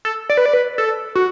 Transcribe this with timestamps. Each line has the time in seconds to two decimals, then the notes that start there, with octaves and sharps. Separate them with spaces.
0.05 A4
0.30 D5
0.37 B4
0.46 D5
0.54 B4
0.78 A4
1.15 F#4